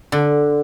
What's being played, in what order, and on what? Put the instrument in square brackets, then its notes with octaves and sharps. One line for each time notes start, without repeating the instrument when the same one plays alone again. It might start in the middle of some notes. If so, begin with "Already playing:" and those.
[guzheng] D3